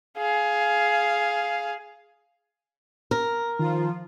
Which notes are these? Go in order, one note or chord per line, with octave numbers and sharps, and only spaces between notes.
G#4 F5
A#4
D#3 F3 F4